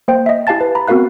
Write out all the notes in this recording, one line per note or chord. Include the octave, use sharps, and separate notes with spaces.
A#3 C5 G5
D#5 E5
E4 G4 F5 G#5 A5 A6
B4
A#5 B5
B3 C4 F#4 A#4 F5 F#6